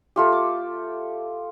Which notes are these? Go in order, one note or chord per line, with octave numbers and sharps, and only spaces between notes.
A3 F4 G4
D6